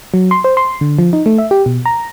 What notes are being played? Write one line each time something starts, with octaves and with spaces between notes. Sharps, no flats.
F#3
C6
C5
C6
D3
F3
D#4
A3
E5
G4
B2
A#5